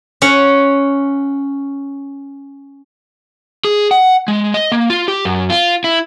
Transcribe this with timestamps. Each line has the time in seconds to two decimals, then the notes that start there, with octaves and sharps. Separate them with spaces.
0.22 C#4 F#5
3.65 G#4
3.91 F#5
4.28 G#3
4.54 D#5
4.72 A#3
4.90 F4
5.08 G4
5.25 F#2
5.50 F4
5.84 E4